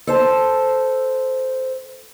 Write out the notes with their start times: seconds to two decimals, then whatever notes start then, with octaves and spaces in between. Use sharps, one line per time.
0.07 A4 C5 A5